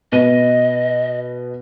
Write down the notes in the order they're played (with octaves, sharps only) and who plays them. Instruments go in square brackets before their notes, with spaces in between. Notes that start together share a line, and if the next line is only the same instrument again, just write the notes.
[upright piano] B2 B4 D#7 [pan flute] D#5